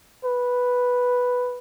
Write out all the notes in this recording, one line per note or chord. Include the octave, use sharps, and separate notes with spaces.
B4